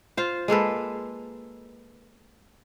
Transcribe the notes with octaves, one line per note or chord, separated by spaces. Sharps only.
F4 C5
G#3 A#3 A4 B4